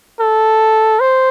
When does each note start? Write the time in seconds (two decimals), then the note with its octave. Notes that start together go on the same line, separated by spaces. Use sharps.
0.20 A4
1.00 C5